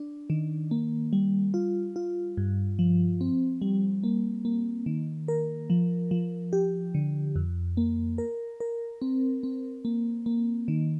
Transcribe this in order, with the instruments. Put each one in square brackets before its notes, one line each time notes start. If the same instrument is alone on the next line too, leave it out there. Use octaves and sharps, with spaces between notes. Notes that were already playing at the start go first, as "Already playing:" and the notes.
Already playing: [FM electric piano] D4
D#3
A#3
G3
F4
F4
G2
F3
C4
G3
A#3
A#3
D#3
A#4
F3
F3
G4
D3
F2
A#3
A#4
A#4
C4
C4
A#3
A#3
D#3